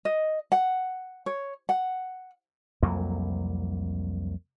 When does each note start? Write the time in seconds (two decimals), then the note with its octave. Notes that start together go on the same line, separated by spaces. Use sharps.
0.05 D#5
0.52 F#5
1.26 C#5
1.69 F#5
2.83 C2 F2 F#3 A#3